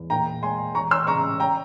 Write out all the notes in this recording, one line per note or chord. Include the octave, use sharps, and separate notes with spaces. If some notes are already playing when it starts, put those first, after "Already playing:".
Already playing: E2
A#2 G5 A#5
G#3 G#5 C6
E1 A#5 C#6
C6 E6
C#3 A#5 C#6
G5 A#5